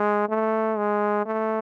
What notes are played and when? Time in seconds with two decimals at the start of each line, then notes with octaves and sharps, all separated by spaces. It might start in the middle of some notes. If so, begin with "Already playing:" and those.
Already playing: G#3
0.29 A3
0.77 G#3
1.26 A3